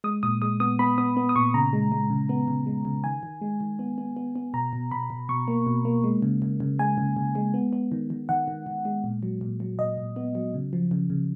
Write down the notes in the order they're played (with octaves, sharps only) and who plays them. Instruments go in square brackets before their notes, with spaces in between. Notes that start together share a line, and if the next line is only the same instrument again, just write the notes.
[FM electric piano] G#3 D#6
A#2 D#6
G#3 D#6
B3 D#6
B3 B5
B3 D#6
B3
D#6
A#2 C#6
C#3 A#5
G#3
G#3
C#3
B3
C#3
G#3
C#3
D#3 G#5
D#3
G#3
D#3
B3
B3
B3
B3
B2 A#5
B2
B2 B5
B2
B2 C#6
A#3
B2
A#3
G#3
C#3
C#3
C#3
G#3 G#5
C#3
C#3
G#3
B3
B3
D#3
D#3
D#3 F#5
D#3
D#3
G#3
A#2
F#3
A#2
F#3
A#2 D#5
A#2
B3
F#3
C#3
F3
C#3
C#3